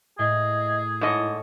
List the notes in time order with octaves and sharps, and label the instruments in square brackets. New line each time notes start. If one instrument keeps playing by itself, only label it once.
[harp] A2 [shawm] G#4 [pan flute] D#5
[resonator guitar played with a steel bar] G#2 D#5 [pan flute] E4 [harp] A4 C#5